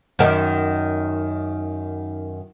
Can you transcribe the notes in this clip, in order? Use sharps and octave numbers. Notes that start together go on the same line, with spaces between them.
F#2 D#3